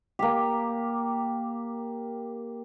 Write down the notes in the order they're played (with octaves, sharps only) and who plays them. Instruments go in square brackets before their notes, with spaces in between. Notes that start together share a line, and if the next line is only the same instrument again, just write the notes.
[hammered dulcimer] A#3 G4